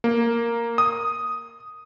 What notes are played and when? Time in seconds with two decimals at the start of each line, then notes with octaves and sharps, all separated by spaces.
0.04 A#3
0.78 D#6